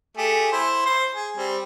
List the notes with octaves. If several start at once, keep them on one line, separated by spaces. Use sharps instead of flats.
A3 G4 G#4
E4 C5
C5 C6
G#4
G3 C4